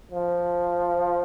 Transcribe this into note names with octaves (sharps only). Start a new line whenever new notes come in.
F3